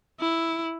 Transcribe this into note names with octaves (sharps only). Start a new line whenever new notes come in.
E4